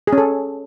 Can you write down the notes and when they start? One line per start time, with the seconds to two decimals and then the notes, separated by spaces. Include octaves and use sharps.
0.07 G#4
0.13 C#4
0.18 A4